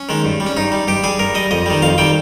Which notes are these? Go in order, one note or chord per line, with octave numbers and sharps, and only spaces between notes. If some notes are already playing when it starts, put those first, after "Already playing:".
Already playing: C#4
D#3 G#3
G2
G3
C#4
G2 D#4
G3
G2 G4
G3 G#4
G2 A#4
G3 D#5
F2 D#5
D#3 G3
F2 F5
D#3 G3 G5